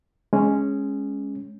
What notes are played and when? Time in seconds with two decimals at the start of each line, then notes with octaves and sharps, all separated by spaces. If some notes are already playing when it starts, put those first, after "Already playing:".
0.33 G#3 C#4